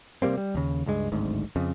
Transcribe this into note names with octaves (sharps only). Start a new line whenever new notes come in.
C3 G3 A#3 C4
G3
D#2 C#3
C#2 G2 G#3
D1 G#1 D2 G#2
F2 C#3